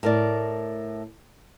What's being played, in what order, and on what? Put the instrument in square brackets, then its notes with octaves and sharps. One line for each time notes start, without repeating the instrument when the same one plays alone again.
[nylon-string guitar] A2 A#4 D5